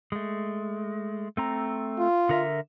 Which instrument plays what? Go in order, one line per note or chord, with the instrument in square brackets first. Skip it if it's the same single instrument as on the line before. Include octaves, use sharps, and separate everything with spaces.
[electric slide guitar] G#3 A3
A3 C4 A#5
[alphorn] F4
[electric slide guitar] D3 A#4 E5